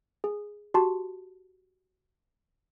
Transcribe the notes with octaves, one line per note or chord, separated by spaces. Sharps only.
G#4
F#4 G4 A5 C6